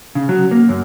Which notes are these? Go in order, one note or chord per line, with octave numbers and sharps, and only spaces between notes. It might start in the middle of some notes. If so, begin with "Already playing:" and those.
C#3
F#3
A#3
F#2